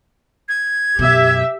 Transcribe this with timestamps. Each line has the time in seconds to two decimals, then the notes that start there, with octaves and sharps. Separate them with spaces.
0.48 G#6
0.99 F#2 B2 G4 E5